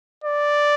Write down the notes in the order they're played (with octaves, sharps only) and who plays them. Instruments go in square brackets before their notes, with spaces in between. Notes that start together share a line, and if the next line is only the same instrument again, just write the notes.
[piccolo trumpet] D5